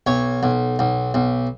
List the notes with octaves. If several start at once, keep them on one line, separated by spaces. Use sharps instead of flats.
B1 C#5
B1
B1
B1